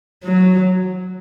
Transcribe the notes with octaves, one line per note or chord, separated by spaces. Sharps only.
F#3